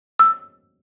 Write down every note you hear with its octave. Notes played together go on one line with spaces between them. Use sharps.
E6